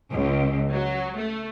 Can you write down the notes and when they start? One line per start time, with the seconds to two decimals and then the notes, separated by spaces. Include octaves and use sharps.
0.10 C#2
0.73 F#3
1.17 A3